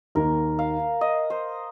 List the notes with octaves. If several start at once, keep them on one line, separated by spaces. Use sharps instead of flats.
D#2 D#3 A#3 A#4
F5
D#5
C5